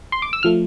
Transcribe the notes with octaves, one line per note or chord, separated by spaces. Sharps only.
C6
D6
E6
F3 A3 F6